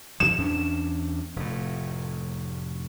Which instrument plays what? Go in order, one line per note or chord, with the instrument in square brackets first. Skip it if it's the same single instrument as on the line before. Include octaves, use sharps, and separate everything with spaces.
[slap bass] F2 F3 [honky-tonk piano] E7
[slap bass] E2 C#4 D4
F1 A2